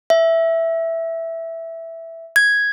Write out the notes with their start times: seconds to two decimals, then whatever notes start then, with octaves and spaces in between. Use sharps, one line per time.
0.10 E5
2.36 G#6